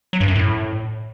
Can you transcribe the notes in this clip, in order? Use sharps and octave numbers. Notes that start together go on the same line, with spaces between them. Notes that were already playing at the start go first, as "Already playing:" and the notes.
F#3
G2
F#2
A2